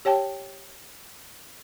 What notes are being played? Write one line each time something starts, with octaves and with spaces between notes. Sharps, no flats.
G4 C#5 G5 A5